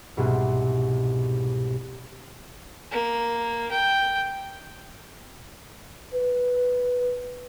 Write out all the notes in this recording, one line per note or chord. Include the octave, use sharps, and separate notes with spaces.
C2 G#2 B2
A#3
G5
B4